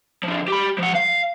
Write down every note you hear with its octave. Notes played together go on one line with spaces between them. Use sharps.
D3 F3
G4 B5
F3 F#5
F5